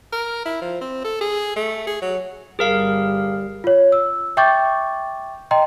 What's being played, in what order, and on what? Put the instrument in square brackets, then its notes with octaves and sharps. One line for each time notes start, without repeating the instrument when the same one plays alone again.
[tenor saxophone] A#4
E4
F3
C4
A4
G#4
A3
G#4
F#3
[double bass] G1 G3 [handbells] G#4 A#4 F5
[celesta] F4 C#5
E6
E5 G5 C#6 D6 G6 A6
D#5 G5 A#5 C6